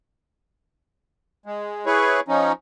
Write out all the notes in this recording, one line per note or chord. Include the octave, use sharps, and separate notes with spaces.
G#3
E4 G#4 B4 C#5
F3 C#4 D#4